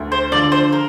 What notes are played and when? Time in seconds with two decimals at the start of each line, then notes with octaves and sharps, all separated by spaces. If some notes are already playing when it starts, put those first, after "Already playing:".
Already playing: D2
0.12 C5
0.32 D3 D5
0.35 F3
0.52 C5
0.72 A#4